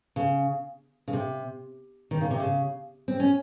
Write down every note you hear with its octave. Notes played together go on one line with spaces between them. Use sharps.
C#3
C#3
C3
D#3
C#3
C3
C#3
C4
C#4